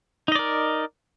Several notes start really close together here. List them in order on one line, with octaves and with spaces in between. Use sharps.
D#4 D#5 D5 A#4